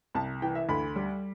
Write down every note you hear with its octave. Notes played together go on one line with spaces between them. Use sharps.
C2 A5
E3 G5
E5
D2 B5
G3